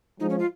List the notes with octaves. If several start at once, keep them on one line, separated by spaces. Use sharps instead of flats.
F3 G#3 D#4
C#4
F4